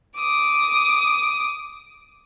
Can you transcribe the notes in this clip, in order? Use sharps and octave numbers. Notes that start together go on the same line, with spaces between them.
D6 D#6